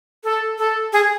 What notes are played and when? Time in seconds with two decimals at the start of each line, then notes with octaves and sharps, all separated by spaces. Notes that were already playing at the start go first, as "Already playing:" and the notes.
0.24 A4
0.58 A4
0.93 G#4